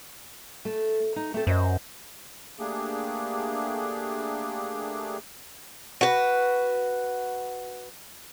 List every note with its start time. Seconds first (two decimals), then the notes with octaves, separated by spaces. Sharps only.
0.65 A3
1.16 D#4
1.34 A3 C4 A4
1.47 F#2 C5 D#5
2.59 A3 A#3 D4 G4 G#4
6.01 F#4 B4